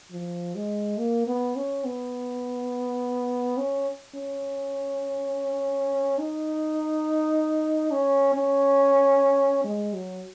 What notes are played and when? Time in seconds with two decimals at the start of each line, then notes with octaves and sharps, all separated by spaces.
0.11 F3
0.55 G#3
0.98 A#3
1.27 B3
1.56 C#4
1.85 B3
3.58 C#4
4.15 C#4
6.19 D#4
7.91 C#4
8.35 C#4
9.64 G#3
9.94 F#3